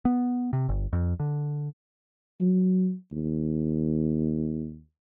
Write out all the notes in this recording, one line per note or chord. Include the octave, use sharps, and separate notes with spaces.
B3
C3
G1
F2
D3
F#3
D#2